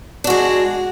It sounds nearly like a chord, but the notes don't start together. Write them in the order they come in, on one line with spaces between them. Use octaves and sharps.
D4 F#4 G#3